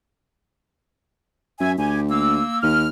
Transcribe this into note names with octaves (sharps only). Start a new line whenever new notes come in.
F#2 E5 G#5
D2 G4 G#5
A#3 E6
D#2 F6